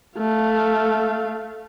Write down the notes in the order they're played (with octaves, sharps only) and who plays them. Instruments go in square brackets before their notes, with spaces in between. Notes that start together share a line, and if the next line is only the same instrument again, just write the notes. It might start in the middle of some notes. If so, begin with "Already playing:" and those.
[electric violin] A3 F5